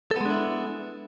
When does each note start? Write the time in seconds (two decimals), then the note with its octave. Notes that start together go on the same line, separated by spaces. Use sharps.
0.11 A4
0.16 B3
0.21 G#3
0.25 D4
0.30 E4